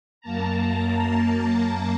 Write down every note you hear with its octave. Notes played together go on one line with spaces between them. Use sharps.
F#2 A#3 A5 A#5